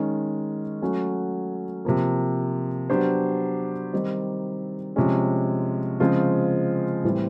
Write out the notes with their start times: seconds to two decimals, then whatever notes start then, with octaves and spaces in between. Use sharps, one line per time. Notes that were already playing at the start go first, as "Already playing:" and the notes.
Already playing: D#3 G#3 C#4
0.82 F#3 A3 C#4 F#4
1.85 C3 F3 A#3
2.90 F#3 B3 D4 G4 C5
3.93 D#3 G3 C4 D#4
4.96 C3 F3 G#3 C#4
6.00 C#3 F3 G#3 C4 F4
7.04 A2 E3 G3 C4